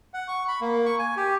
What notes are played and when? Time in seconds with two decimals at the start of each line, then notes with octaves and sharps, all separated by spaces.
0.14 F#5
0.28 C#6
0.48 B5
0.61 A#3
0.86 C#6
0.99 G#5
1.17 G4